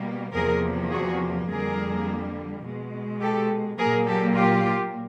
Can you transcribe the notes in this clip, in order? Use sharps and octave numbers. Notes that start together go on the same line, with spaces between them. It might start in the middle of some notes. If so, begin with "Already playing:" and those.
Already playing: B2 G3 A#3
E2 C3 F3 A#3 G#4 A#4
F#4 G#4
F2 D3 G3 A#3 G#4 A#4
B2 G#3
G4 A4
A#2 F#3 A#3 G#4 A#4
G4 A4
F4 G4